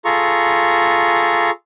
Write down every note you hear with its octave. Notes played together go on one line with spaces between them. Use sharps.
F4 G#4 A4 A#5 C#6